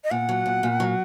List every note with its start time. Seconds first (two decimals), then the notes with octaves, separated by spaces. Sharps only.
0.04 D#5
0.11 A#2 F#5
0.29 F#3
0.46 A#2
0.63 A#2
0.80 F#3